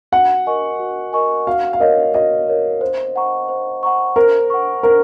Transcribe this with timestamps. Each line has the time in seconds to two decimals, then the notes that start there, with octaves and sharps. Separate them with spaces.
0.12 F#4 F#5
0.47 A#4 D#5 G#5 C#6
0.79 F#4
1.13 A#4 D#5 G#5 C#6
1.47 F#4 F5
1.73 F5
1.80 A#4 C#5 D#5
2.14 F#4 D#5
2.49 A#4 C#5
2.81 C5
3.16 F#5 A#5 C#6
3.49 C5
3.83 F#5 A#5 C#6
4.16 A#4 C5
4.50 F#5 C#6
4.83 A#4 C5